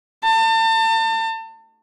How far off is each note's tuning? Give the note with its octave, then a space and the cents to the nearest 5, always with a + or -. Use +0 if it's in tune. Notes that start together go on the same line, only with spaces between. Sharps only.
A5 +35